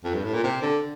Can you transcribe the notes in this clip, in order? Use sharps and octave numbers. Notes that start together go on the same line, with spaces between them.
F2
G2
A2
A#2
C3
D3